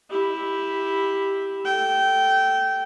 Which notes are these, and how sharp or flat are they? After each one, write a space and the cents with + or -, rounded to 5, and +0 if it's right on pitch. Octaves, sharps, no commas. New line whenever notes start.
E4 -5 G4 +5
A4 +0 G5 -20